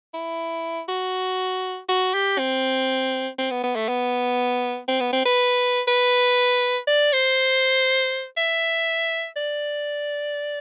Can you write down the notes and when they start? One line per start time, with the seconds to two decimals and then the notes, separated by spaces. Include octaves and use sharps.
0.14 E4
0.89 F#4
1.89 F#4
2.14 G4
2.38 C4
3.39 C4
3.51 B3
3.63 B3
3.76 A3
3.88 B3
4.88 C4
5.00 B3
5.13 C4
5.26 B4
5.88 B4
6.88 D5
7.13 C5
8.37 E5
9.37 D5